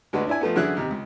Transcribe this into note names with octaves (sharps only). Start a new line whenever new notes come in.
D2 G#3 F#4 B4
D4 E4 G#5
F3 A3 B3
F#2 D3 E3 E4 G#4 F#6
D#2 C3
C#2